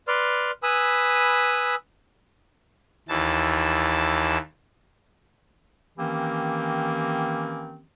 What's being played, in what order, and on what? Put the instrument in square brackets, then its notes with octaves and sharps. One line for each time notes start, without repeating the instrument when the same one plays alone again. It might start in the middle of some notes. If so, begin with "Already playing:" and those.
[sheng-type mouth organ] B4 D5 C6 F6
B4 G#5 B5 D#6 E6
[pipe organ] D#2 E3 A5
[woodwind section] D#3 E3 A#3 C4 C#4 G4